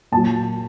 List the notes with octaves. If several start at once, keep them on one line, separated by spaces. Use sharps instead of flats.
A#2 F#3 A5